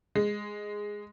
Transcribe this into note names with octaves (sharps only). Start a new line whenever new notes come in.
G#3